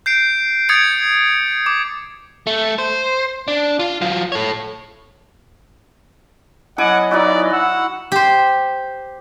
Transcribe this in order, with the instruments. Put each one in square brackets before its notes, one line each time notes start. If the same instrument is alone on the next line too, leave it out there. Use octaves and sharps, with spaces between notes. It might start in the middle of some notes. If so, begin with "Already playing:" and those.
[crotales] G6 C7 D7
D#6 G#6 A6 C#7 D7
D6
[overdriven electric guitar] A3
C5
D4
F4
F#3 F4
A4 C#5
[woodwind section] F#3 B3 D#5 [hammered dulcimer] E4 G#5 D6 [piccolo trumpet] F#5
[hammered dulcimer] D#4 E4 F#4 [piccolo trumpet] D5
[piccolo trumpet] F#5 [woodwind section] E6
[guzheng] G4 C5